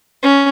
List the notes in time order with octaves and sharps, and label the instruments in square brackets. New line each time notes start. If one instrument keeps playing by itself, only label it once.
[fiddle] C#4